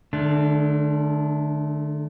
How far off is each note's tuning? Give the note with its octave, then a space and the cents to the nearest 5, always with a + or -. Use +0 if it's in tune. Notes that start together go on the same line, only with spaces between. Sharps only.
D3 +40 A3 -20 D4 -20